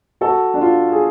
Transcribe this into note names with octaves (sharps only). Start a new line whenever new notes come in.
F#4 A4
D4
F4
G#4